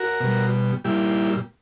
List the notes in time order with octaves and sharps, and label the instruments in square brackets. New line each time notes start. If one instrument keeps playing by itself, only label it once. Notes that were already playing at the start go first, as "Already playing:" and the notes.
Already playing: [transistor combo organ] F#4 A#4
B2 G3
A#2 G3 E4 G4